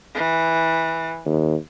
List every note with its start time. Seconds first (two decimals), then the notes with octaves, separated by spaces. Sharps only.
0.15 E3
1.25 D#2